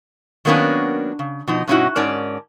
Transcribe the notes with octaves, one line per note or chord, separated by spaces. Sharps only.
D#3 F#3 A#3 B3 C#4 D4
C#3
B2 F3 D#4
G2 B2 C#4 D#4 E4 F#4
G#2 C#4 A#4 D5 A5